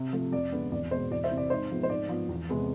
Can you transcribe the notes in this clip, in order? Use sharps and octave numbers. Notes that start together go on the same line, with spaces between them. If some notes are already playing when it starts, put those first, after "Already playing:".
Already playing: C3
F3 A3
F2 D5
D3 G#3 B3
E2 D5
B2 G#3 B3 C5
E2 D5
C5 E5
C3 E3
D5
G#2 C5
F3 G#3 B3
C5
G#2 D5
F3 B3
E2
C3 G#3 B3